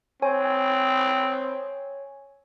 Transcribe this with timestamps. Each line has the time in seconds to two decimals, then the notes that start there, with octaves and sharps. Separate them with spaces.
0.22 C4 C#5 G#5